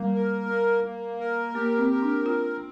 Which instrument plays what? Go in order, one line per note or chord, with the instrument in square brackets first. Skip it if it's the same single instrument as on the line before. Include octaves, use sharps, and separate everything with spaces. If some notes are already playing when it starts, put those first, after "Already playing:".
Already playing: [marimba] G3 [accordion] A#3
[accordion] A#4
A#3
A#3
A#4
[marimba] A#3 [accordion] G4
[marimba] C4
[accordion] A#4
[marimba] D4
[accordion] C4 [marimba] F4